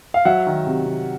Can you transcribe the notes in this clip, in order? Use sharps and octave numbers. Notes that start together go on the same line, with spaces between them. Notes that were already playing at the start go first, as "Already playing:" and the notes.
F5
F#3 E5 F#5
D#3
C3
C3